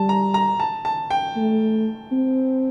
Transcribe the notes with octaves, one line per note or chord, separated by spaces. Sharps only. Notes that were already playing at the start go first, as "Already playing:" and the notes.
Already playing: G3 A5
A#5
A#5
A5
A5
G5
A3
C4